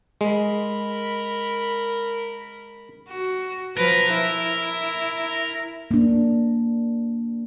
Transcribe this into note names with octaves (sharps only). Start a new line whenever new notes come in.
G#3 A#4 B5
F#4
F3 A#4 B4
E4
A#3 D4